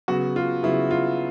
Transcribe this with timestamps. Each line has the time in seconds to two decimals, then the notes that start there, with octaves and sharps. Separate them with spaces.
0.08 C#3 F#3 B3 F#4
0.36 F4
0.63 C#3 F#3 B3 E4
0.91 F4